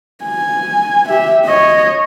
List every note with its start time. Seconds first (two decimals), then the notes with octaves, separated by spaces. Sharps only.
0.24 G#5
1.09 G4 E5
1.45 C#5 D#5